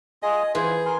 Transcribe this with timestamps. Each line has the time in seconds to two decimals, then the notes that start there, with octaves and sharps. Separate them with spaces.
0.23 F4 G#4 D#5 G#5
0.55 E3 F4 G#4 C5
0.86 A#4 G#5 C6